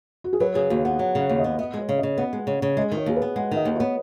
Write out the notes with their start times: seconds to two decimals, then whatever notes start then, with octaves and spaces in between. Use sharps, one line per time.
0.24 F#4
0.33 G#4
0.40 F#3 B4
0.55 C#3 G#4
0.70 D#2 F#4
0.85 B3 F#5
0.99 F#3 F#5
1.15 C#3 F#5
1.29 D#2
1.39 D#5
1.44 B3
1.59 B3 D#5
1.74 G#3 C#5
1.89 C#3
1.98 D#5
2.03 C#3
2.18 B3 F#5
2.33 G#3
2.47 C#3
2.62 C#3
2.77 G#3 D#5
2.92 D#3 C#5
3.06 D#2 G#4
3.16 B4
3.22 B3
3.36 G#3 F#5
3.51 D#3 D#5
3.65 D#2
3.76 C#5
3.80 B3